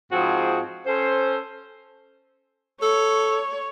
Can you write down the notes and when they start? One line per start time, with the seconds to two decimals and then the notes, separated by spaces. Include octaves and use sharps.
0.12 G#2 F3 C4 F#4 G#4
0.87 C#4 A4 C5
2.82 A4 C#5